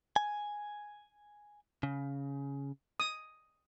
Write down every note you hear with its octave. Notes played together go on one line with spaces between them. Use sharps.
G#5
C#3
D#6